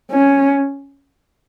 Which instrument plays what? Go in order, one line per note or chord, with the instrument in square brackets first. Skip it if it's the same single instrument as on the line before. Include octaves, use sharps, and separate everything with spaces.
[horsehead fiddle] C#4